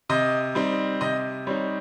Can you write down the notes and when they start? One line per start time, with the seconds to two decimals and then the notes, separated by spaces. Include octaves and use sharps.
0.09 C3 D#5
0.55 G3 C4 D#4
1.01 C3 D#5
1.47 G3 C4 D#4 C#5